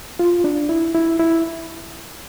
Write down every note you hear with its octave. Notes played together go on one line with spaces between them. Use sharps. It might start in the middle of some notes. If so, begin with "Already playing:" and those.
F4
D4
E4
E4
E4